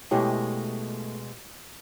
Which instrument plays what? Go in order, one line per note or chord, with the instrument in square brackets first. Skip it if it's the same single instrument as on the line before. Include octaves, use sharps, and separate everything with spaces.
[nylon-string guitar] B2 G#3 D#5 [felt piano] A3 [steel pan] E4 G4 C#5